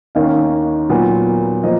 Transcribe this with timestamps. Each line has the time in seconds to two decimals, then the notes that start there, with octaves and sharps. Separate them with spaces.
0.15 D#2 D#3 A#3 C#4 F5
0.89 A#2 F#3 B3
1.63 F3 A#3 D#5